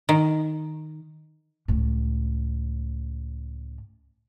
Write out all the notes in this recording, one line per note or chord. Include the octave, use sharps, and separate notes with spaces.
D#3
C#2 A2